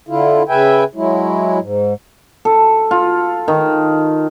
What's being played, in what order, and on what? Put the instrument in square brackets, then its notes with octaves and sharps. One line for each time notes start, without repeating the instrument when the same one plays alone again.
[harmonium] D3 E4 F4
C#3 B4 E5 G5 G#5
F#3 G#3 E4
G#2
[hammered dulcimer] A4
F4
D#3